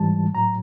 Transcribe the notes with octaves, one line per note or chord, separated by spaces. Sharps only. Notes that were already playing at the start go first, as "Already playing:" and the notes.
Already playing: G#2 E3 G3 A5
A2 F#3 A#5